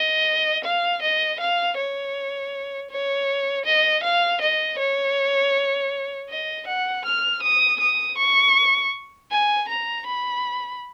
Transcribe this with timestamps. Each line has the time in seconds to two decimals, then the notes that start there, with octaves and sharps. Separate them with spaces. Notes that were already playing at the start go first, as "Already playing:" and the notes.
Already playing: D#5
0.64 F5
1.02 D#5
1.40 F5
1.78 C#5
2.91 C#5
3.66 D#5
4.04 F5
4.41 D#5
4.79 C#5
6.30 D#5
6.67 F#5
7.05 F6
7.43 D#6
7.80 D#6
8.18 C#6
9.31 G#5
9.69 A#5
10.07 B5